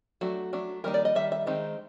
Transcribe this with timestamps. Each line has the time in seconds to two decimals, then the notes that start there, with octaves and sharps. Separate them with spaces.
0.21 F#3 A3 D4 F#4
0.53 F#3 A3 D4
0.84 D#3 G3 A#3 D#4 A#4
0.94 D5
1.05 D#5
1.15 D#3 G3 E5
1.32 E5
1.46 D#3 G#3 C4 D#4